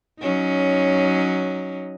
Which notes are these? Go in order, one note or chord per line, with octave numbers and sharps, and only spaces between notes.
F#3 C#4 D#4